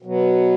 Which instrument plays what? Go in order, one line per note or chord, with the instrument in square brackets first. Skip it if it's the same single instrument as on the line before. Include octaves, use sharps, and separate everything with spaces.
[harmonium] B2 F#3 B3